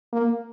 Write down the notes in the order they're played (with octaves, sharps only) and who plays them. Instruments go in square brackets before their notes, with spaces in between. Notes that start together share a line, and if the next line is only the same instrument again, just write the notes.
[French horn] A#3